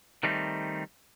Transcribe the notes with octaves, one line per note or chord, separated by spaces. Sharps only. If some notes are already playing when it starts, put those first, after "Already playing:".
D#3 G3 A3 C4 D#4